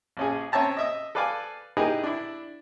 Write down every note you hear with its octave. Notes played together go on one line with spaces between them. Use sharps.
A#1 C#4 G#4
C4 C#4 C#5 E5 A5 A#5
D#5 E5 D#6
A4 B4 D5 F5 G#5 D6
D#4 E4 G4 G#4 A#4 B4
D4 E4